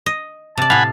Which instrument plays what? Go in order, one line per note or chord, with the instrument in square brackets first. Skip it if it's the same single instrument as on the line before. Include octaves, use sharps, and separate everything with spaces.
[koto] D#5
[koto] C3 D5 [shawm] A5
[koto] A2 F5 [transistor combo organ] F#5 G#5 B5